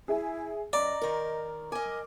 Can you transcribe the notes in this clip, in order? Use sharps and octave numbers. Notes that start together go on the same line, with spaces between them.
E4 G#4 E5 G#5
F#2 D5 D#5 A#5
D#3 A#4
A#4 D#5 G#5 D6